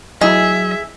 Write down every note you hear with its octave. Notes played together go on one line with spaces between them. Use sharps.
F#3 E4 G#4 D#5 E5